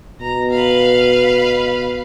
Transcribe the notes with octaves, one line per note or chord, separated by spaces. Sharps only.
B2 A#5
B4 F5